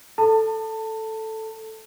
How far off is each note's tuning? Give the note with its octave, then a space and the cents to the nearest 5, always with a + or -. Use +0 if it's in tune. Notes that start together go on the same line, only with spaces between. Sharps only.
A4 +0 A5 +25